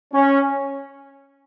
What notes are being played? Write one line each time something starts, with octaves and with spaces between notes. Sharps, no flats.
C#4